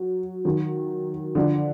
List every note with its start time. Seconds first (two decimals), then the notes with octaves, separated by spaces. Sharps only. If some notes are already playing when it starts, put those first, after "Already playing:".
Already playing: F#3
0.45 D#3 F#3
1.35 D3 F3